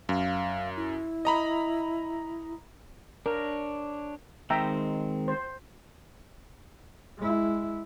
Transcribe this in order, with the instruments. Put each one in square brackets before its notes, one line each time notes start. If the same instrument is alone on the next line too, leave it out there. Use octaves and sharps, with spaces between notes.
[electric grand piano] F#2 [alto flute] F5
[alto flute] E4
[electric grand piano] D#5 A#5 B5
[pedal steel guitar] D4 C#5 [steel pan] A#4
[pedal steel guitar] D#3 G#3 C4 [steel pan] E5 G5 A#5
[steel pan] C5
[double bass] G#3 E4